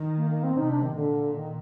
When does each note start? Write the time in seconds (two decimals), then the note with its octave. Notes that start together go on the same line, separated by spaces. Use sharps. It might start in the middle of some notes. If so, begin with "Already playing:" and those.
Already playing: D#3
0.17 A#3
0.31 A#3
0.43 C4
0.57 C3 D#4
0.70 D4
0.82 D#3
0.96 A#2 D3
1.35 D#3